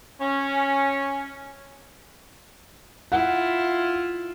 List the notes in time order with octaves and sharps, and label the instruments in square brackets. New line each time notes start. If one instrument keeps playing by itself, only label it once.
[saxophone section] C#4
[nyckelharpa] E4 F4 [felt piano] F#5